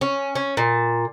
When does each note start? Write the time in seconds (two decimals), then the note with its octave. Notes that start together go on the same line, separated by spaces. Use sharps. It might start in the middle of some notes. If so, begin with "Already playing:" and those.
0.01 C#4
0.35 C#4
0.57 A#2